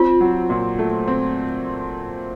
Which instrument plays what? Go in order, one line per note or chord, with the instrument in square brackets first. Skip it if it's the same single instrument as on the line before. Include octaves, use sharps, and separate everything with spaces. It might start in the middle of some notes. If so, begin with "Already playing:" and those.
Already playing: [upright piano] C4 [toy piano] F4
[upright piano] F#3
A#2
A3
C4